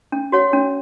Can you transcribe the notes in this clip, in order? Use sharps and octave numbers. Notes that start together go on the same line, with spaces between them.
C#4
F#4 C#5 F#5
C#4